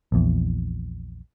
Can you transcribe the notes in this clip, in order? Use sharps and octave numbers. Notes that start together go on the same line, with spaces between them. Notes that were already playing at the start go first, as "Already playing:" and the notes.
A#1 E2